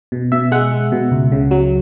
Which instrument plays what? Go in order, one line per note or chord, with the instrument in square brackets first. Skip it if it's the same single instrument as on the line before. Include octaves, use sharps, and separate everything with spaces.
[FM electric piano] B2
B2 E5
G#3 F#5
G#3
B2
C#2
C#3
F#3